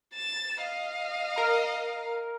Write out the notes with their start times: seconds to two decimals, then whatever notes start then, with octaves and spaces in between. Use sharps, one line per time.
0.14 A6 E7
0.63 D#5 F5
1.36 A#4 A#5